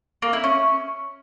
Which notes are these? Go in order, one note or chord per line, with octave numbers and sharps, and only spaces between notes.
A#3
E4
C#4